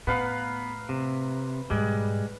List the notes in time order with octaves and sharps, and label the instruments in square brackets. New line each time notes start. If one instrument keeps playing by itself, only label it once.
[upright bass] A2 [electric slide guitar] B3 [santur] B4 F5 A#5
[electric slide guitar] C3
[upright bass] G#2 B2 [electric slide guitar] G3 G#3